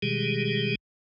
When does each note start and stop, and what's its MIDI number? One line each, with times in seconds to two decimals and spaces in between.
0.02 0.75 47
0.02 0.75 51
0.02 0.75 55
0.02 0.75 56
0.02 0.75 67
0.02 0.75 68